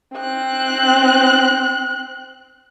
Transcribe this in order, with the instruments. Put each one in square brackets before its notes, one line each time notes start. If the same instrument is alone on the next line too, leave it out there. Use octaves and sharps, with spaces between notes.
[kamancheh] C4 F#6